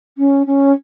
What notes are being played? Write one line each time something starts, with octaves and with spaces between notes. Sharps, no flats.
C#4
C#4